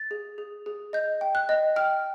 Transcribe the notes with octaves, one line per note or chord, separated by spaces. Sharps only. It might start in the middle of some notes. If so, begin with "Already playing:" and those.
Already playing: A6
G#4
G#4
G#4
D#5 G6
G5
F#6
D#5
G5 F6